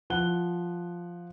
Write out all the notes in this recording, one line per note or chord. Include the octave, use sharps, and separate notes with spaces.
F3 F#5 F#6 G7